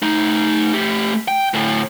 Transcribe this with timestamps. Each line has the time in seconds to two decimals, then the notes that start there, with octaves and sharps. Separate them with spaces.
0.02 A3 D#4
0.74 A3 G4
1.28 G5
1.54 D2 A2